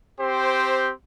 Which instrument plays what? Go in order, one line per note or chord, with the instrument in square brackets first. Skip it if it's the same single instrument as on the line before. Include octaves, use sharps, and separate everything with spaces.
[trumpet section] C4 G4 C5